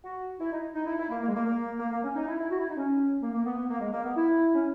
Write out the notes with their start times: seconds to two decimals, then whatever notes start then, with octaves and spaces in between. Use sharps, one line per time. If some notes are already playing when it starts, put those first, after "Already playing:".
0.03 F#4
0.39 E4
0.51 D#4
0.74 D#4
0.85 E4
0.98 E4
1.09 A#3
1.21 A#3
1.28 G#3
1.34 A#3
1.45 A#3
1.80 A#3
1.92 A#3
2.03 C#4
2.15 D#4
2.27 E4
2.39 E4
2.50 F#4
2.59 E4
2.69 D#4
2.77 C#4
3.21 A#3
3.33 A#3
3.44 B3
3.56 B3
3.68 A#3
3.80 G#3
3.92 A#3
4.03 B3
4.15 E4
4.55 C#4